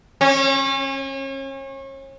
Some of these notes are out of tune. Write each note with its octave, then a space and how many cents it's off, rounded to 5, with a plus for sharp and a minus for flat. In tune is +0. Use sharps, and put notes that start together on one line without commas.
C#4 -35